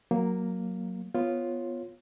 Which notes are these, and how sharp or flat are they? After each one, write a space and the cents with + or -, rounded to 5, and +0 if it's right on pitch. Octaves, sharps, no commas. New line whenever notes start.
F#3 -5 A#3 +0
B3 +0 F4 +0 C#5 -20